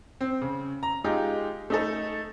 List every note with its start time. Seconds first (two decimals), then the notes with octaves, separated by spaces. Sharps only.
0.21 C4
0.42 C#3
0.83 A#5
1.04 G#3 D#4 F4 G4
1.70 A3 D#4 A4